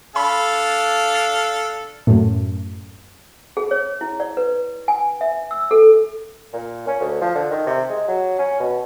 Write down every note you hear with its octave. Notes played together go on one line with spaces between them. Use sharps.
D4 A4 F5 B5
F#2 A2
G#4
C#5
E4
D5
B4
G#5
E5
E6
A4
A#2
C#4
D2
F3
D3
D#3
C3
G#3
F#3
C#4
B2